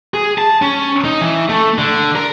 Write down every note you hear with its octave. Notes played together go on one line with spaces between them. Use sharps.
G#4
A5
C#4
D#4
E3
A3
D3
A#4